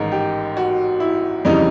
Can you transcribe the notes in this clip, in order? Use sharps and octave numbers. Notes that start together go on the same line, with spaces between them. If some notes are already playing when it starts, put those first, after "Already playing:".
Already playing: A1 G#2 D#3 A#4
G4
F#4
E4
F2 C#3 E3 G3 D#4